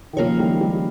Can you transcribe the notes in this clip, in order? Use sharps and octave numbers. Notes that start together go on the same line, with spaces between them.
D#3
C#3 F3 A#3 F4 A#4 C#5
D#3 G3
D#3 G3